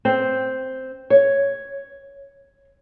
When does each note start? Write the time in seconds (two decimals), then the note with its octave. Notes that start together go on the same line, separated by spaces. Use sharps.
0.05 C4
1.10 C#5